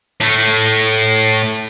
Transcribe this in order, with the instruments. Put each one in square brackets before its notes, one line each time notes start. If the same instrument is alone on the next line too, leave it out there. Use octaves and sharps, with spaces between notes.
[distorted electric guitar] A2 A3